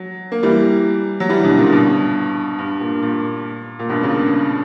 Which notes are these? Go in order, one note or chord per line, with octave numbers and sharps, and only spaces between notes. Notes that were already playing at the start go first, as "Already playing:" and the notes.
Already playing: F#3
A#3
E3 G3
F#3
E3 G3
B2 D3
A#2 C#3
G2 B2
G2
A#2
A#2
A#2
G2 B2
A#2 C#3